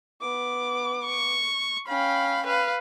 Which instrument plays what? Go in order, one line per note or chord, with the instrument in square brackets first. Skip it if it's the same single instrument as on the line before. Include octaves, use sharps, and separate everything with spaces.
[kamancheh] B3 D6
[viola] C#6
[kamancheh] C#4 G5 [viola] F5 B5
[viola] B4 F5